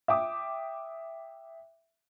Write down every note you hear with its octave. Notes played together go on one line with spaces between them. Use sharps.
E5 G5 D6 D#6